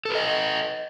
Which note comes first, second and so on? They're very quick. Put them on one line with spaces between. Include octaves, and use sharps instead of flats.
A4 B4 D#5